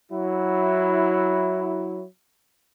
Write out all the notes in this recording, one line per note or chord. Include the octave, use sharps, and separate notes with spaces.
F#3 E4